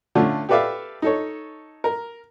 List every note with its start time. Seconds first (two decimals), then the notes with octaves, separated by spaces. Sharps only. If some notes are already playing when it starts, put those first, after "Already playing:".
0.15 D3 A3 C#4 F4
0.49 G4 A4 B4 D5 E5 F5
1.02 D#4 A4 C#5
1.84 A#4